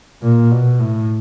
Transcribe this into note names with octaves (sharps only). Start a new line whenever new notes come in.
A#2
B2
A2